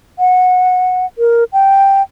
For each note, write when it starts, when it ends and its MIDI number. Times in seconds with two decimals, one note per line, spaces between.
0.19 1.06 78
1.18 1.44 70
1.53 2.02 79